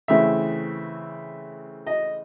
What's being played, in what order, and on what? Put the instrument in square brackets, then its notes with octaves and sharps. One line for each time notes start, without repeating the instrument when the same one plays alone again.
[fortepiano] C#3 E3 A3 C4 E5
D#5